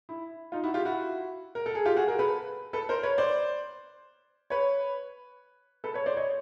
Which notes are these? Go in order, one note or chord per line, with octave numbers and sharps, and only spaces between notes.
E4
D#4 F4
E4 F#4
F4 G4
E4 F#4
A#4
A4
G#4
F4 G4
F#4 G#4
G#4 A#4
A4 B4
A4 B4
A#4 C5
B4 C#5
C5 D5
B4 C#5
A4 B4
B4 C#5
C5 D5
C#5 D#5